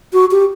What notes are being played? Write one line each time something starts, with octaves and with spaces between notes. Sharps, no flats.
F#4
G4